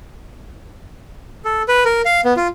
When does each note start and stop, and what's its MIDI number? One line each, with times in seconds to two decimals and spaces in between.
1.45 1.62 69
1.68 1.84 71
1.85 2.02 70
2.05 2.21 77
2.25 2.34 59
2.37 2.48 65